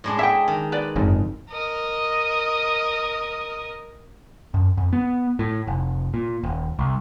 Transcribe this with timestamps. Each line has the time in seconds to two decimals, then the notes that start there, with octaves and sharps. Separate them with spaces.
0.04 A2 G#3 D4
0.19 G#4 E5 G5
0.48 D#3
0.72 B4 D5
0.96 F#1 F2 G#2
1.50 A#4 D#5
4.54 F#2
4.77 F2
4.93 B3
5.39 A2
5.67 F1
6.14 A#2
6.43 D#1
6.79 C2